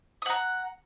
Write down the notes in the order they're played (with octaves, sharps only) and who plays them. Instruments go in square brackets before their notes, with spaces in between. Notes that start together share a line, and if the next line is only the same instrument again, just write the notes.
[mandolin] D#6
F#5
A#5